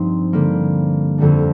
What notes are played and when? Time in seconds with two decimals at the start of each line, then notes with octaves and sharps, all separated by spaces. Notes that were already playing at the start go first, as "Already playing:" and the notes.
Already playing: G2 F3 C4 D#4
0.33 D3 G3 A#3
1.18 F2 D3 G3 D4